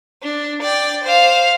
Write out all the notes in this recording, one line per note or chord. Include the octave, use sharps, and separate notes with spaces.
D4
D5 G5
C5 F5